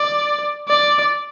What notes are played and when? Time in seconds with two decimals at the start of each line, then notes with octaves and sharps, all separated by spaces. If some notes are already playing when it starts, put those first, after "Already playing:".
Already playing: D5
0.68 D5